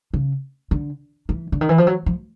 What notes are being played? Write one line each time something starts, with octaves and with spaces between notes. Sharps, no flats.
C#3
D3
E3
D3
D#3
E3
F3
F#3
F3